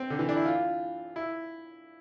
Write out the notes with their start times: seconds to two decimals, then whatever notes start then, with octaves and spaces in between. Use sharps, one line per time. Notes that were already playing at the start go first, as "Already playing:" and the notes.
Already playing: C4
0.10 D3
0.19 E3
0.29 D4
0.36 E4
0.46 F4
1.16 E4